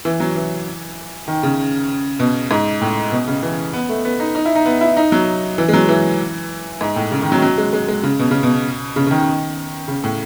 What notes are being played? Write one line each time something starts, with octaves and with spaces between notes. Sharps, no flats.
E3
F#3
E3
D#3
C#3
B2
G#2
A2
B2
C#3
E3
B3
A3
B3
D#4
D#4
E4
D#4
B3
E4
D#4
F#3
E3
G#3
F#3
E3
G#2
A2
C#3
D#3
F#3
F#3
G#3
G#3
G#3
C#3
B2
C#3
B2
C#3
C#3
D#3
C#3
A2